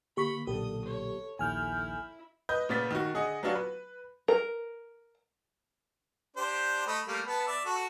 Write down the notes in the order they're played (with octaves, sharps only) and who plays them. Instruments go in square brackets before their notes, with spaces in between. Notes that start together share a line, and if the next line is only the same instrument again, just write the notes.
[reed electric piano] D3 A#3 [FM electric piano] G4 C#6 B6 [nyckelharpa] B5
[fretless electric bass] B1 A#2 D3 [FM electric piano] G4 [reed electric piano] A4 [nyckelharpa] D#6
[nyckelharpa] C#5
[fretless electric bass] A#1 D#2 [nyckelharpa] E4 [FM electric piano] G#5 F6 G6
[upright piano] B4 D#5 G6
A#2 C#3 B3 A6 B6
D#3 F#4
D3 G#4 D#5 F#5
F#3 B3 C#4 D4 F4 F#4
B4
[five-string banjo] A#4
[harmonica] D4 G4 C5
A3 D#5 B5
G3 A3 A#3
B3 A5 B5
D5 E5
F#4 A4